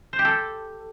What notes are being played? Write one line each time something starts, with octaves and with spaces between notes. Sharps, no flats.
C5
G4
A4